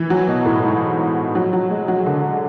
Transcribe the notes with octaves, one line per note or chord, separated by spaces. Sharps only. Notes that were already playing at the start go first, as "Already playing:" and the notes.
Already playing: E3
F#3
B2
A2
G#2
F#3
F#3
G#3
F#3
D3